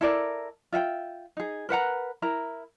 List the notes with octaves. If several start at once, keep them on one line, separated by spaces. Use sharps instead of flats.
E4 A4 A#4 D5
F4 E5 F#5 G5
D#4 G#4
A#4 B4 F#5 A#5
E4 A#4 A#5